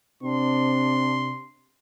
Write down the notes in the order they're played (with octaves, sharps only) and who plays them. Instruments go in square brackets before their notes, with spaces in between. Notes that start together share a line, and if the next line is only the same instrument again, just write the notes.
[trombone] C3 [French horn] C4 [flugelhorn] D4 [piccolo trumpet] C6